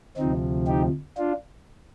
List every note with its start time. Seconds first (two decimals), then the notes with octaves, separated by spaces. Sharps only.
0.17 D2 C3 F3 C4 D#4
0.67 D#4 G4
1.18 D4 F4